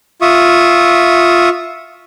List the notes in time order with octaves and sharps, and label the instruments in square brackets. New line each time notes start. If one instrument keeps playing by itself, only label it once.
[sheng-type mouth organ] F4 E5 C#6 D#6